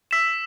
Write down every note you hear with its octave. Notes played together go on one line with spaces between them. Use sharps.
E6 B6 E7